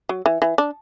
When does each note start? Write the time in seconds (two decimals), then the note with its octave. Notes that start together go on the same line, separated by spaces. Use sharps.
0.09 F#3
0.26 E3
0.42 E3
0.58 D4